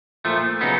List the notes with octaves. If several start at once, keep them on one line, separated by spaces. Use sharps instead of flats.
A#2 F3 A3
C#3 F#3 B3 D#4